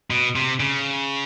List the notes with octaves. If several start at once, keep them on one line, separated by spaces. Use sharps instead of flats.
B2
C3
C#3